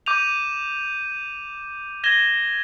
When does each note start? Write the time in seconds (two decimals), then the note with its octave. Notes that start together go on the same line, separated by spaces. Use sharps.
0.06 D6 G6 D#7 F7
2.04 G#6 A#6 E7 G7